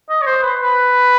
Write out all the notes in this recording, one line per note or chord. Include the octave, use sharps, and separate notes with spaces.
D#5
C#5
C5
B4
B4